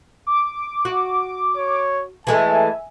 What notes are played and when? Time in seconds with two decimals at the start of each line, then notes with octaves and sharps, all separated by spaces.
0.27 D6
0.85 F#4
1.57 C#5
2.27 E3 G#3 A3 E5 G#5 A5